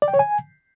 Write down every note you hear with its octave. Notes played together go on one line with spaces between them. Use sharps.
D5
G5
C#5
G#5